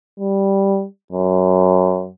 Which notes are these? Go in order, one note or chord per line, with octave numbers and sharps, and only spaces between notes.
G3
F#2